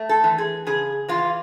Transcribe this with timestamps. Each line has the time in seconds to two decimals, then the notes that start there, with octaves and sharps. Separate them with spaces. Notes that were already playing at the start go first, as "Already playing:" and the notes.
Already playing: A3
0.09 A4
0.24 E3
0.38 G#4
0.67 C#3 G#4
1.08 E3 F4